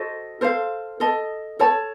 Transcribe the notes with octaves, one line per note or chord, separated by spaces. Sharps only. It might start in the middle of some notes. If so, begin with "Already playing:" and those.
Already playing: F#4 A4 C5 D#5
A4 C5 F5
A4 D#5 A5
A4 C#5 A5